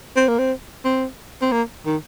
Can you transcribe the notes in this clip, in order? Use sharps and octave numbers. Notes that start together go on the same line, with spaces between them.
C4
A#3
C4
C4
C4
A#3
D#3